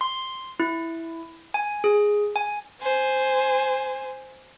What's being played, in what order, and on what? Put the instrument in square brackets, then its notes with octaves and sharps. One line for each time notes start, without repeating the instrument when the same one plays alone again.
[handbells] C6
E4
G#5
G#4
G#5
[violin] C5 G#5